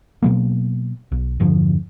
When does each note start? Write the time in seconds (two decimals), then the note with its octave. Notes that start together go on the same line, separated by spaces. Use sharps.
0.23 B2 F#3 A#3
1.12 B1
1.40 E1 G2 D3 F3